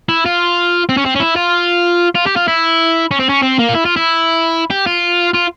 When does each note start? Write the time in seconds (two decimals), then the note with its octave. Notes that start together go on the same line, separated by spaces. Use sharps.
0.09 E4
0.25 F4
0.89 C4
0.97 C#4
1.05 C4
1.15 C#4
1.20 E4
1.36 F4
2.15 F4
2.27 G4
2.37 F4
2.48 E4
3.11 C#4
3.20 C4
3.29 C#4
3.42 C4
3.59 A#3
3.69 F4
3.75 E4
3.85 F4
3.96 E4
4.71 G4
4.87 F4
5.34 F4